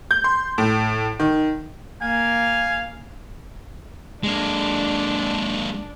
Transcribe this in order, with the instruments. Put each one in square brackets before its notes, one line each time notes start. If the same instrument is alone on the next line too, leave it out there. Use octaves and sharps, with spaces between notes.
[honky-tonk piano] G6
C6
A2
D#3
[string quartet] A#3 [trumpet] F5 [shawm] G#5
[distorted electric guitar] G#3 A#3 [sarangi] D4